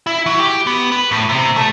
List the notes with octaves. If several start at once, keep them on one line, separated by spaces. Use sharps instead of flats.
E4
F#3
G4
B3
B4
A2
C3
A3